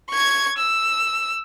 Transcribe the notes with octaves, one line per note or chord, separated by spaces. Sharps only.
C#6 G#6
E6